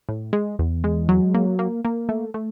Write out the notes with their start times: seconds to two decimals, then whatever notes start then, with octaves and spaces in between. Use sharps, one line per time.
0.09 A2
0.33 G#3
0.59 E2
0.84 G#3
1.09 F#3
1.34 A#3
1.59 A#3
1.85 A#3
2.09 A3
2.34 A3